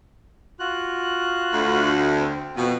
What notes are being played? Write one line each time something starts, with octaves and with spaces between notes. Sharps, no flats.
F4 F#4 F#6
D2
C4
F2 B2 F#4